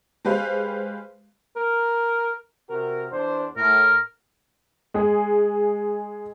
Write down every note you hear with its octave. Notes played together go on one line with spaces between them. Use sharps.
G#3 G4 B4 C5 F5
A#4
C3 F#4 A#4
E2 D4 C5
A2 A#4
G#3 G#4